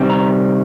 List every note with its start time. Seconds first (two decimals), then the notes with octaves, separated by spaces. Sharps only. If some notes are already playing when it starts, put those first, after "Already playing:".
Already playing: C3 D#3 G3 C4
0.10 A#5